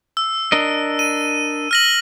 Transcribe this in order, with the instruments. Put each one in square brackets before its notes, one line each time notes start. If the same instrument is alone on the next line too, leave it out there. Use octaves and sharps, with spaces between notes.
[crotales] E6
[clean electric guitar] D4 A#4 D#5 [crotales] E6
[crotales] D#7
F6 A#6 F#7